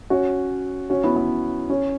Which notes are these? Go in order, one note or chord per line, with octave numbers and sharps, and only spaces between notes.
C#4 F#4
C#4 F#4
B3 E4
B3
C#4